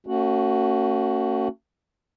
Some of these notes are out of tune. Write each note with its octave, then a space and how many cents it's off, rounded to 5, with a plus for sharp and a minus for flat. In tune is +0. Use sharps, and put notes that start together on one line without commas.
A3 +45 C#4 -10 F#4 +0